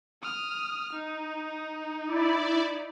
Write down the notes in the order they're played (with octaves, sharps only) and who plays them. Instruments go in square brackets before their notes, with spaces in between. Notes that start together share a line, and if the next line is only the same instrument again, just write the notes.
[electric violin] D#6 F6
D#4
[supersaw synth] E4 D5